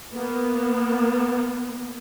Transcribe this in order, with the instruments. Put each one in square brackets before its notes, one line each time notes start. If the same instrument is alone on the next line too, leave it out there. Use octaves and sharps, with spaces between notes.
[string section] A#3 B3